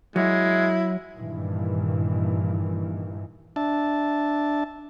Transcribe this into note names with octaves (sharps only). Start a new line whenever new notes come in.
F#3 G#3 E4
G2 A#2 D#3 E3
D4 E5 A5